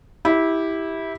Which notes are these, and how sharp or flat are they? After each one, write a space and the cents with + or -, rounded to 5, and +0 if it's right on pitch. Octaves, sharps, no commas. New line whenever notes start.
E4 -15 G4 +0